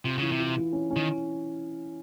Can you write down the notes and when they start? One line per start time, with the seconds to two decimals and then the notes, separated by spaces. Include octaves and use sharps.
0.05 C3 F4
0.18 C#3 E3
0.32 C3
0.39 F4
0.57 E3
0.73 C#4
0.91 C#4
0.96 D#3